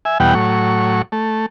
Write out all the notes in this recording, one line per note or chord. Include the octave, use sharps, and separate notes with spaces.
E5 G#5
E2 B2 G3 F#5 G5
A2 F#3 C#6
A3